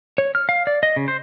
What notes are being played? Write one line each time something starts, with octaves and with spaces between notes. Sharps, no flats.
C#5
F6
F5
D5
D#5
C#3
C5